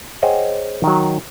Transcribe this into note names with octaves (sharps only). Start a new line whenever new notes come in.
G#4 C5 C#5 D#5 F#5 G5
D#3 F#3